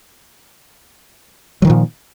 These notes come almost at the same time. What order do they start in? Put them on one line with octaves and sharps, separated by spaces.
F#3 D#3 F3 A#2